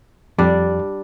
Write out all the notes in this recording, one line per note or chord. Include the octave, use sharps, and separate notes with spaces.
F2 G3 D4 D5